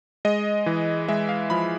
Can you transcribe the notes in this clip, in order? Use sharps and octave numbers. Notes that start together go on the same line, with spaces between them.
G#3 D#5
E3
G#3 E5
F5
F3 B5